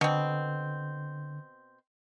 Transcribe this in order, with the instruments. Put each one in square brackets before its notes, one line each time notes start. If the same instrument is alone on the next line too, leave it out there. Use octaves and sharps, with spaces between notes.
[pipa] B2 C4 [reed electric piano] D3